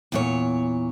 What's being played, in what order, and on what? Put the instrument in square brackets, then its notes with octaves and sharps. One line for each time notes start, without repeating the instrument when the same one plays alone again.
[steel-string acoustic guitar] E2 A#2 C#5